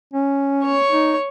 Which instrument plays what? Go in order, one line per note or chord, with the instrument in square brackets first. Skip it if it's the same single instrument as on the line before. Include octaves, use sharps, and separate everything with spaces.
[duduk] C#4
[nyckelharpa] C#5 C#6
[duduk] D#4